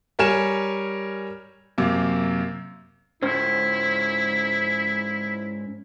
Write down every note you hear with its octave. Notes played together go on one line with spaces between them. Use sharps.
G3 A#4 C#5 G#5 E7
F#2 C3 A#3
G#2 C#4 E4 C5